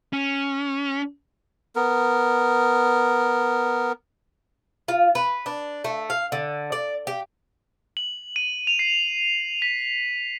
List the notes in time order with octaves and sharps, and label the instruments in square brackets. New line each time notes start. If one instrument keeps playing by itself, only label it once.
[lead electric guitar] C#4
[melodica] B3 A#4
[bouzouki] F4
B4
D4
A3
F5
D3
D5
G4
[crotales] F#7
D#7
F7
C7
B6